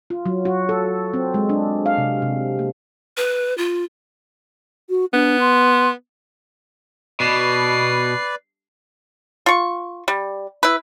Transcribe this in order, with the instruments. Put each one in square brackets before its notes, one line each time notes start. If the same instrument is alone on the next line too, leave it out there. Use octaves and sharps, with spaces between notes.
[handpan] F4
F#3
F#4
A4
C4
G#3
D4
F5
C3
C3
A#3
[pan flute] B4
F4
[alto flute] F#4
[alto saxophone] B3 [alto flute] D4
[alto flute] C6
[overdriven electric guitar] B2 [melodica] B4 D5 [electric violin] C7
[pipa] F4 C#6
G3
E4 B4